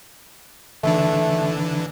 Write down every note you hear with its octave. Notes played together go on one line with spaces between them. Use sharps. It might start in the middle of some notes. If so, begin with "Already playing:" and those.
D3 E3 A3 D4